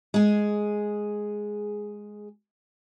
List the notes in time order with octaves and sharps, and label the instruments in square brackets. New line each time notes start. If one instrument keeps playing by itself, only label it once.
[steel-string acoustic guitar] G#3 G#4